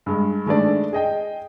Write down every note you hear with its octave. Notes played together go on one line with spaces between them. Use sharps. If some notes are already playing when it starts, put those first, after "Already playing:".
G2 G#3
D#3 G#3 A3 D4 D5
G#4 D#5 G5